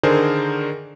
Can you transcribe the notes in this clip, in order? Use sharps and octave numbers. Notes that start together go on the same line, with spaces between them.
D3 D#3 G#4 A#4 C5 D5